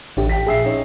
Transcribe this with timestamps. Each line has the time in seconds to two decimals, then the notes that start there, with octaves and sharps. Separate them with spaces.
0.17 A1 D3 G4
0.29 G5 B6
0.47 A#1 G#4 E5 C7
0.64 C#4 D#4